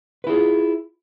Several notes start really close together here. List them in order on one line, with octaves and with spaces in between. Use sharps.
B4 E4 G#4 F4